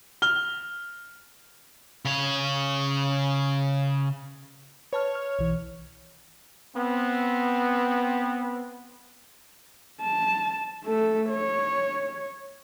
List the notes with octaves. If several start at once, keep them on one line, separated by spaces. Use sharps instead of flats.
F6 G7
C#3 C#5
B4 C#5 A5 F6
F6
B1 E3
B3 C4
A5
A3 A4
C#5